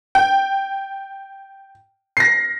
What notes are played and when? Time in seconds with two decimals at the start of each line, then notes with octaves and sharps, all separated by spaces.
0.15 G5
2.17 A#6 C7